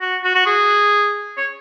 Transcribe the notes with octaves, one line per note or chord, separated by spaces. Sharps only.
F#4
F#4
F#4
G#4
C#5